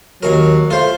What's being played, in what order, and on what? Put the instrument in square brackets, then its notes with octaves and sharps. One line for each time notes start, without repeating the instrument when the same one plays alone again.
[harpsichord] D#2 A#4 [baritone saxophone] F#3
[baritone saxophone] A3 [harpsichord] F4 C5